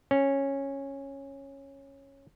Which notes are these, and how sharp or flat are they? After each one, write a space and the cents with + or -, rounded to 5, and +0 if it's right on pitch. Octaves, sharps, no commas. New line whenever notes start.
C#4 -10